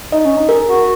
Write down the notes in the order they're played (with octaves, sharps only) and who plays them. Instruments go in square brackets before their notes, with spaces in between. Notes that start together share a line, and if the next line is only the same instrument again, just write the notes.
[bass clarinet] D#4 [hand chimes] D#5
[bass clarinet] C#4
D#4
[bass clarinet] G#4 [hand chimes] A#4
[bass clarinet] F#4